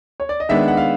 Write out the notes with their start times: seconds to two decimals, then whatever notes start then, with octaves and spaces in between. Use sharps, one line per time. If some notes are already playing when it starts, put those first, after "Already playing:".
0.20 C#5
0.29 D5
0.40 D#5
0.49 D#3 G#3 B3 D4 E5
0.68 F#5
0.77 F5